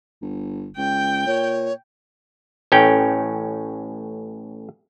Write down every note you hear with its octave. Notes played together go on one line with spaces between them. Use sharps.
G1
C#2 G5
A#2 C#5
A1 A2 C#4 G5